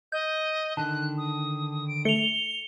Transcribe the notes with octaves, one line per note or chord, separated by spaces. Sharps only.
D#5 G6
D3 D#3 A5 F#6
D#6
D7
A3 C#7 F7 G7